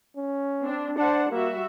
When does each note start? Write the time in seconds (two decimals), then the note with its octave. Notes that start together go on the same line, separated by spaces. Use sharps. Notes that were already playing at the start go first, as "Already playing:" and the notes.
0.17 C#4
0.61 C4 D4
0.98 D4 C5 F#5 A5
1.31 G3 A#3 F#4 E5